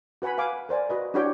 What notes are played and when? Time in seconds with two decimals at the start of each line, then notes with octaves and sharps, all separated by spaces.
0.22 F#4 B4 F#5 G#5 B5
0.38 B4 F5 G#5 D6
0.69 A#4 C5 D5 G#5
0.90 F#4 B4 D#5
1.14 D4 E4 F#4 G4 C#5 G5